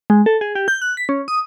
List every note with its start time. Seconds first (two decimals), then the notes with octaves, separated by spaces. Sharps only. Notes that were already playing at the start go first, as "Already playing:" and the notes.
0.10 G#3
0.26 A4
0.41 G#4
0.55 G4
0.68 G6
0.82 F#6
0.97 B6
1.09 C#4
1.28 D#6